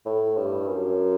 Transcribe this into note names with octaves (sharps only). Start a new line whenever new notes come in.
A2
G2
F#2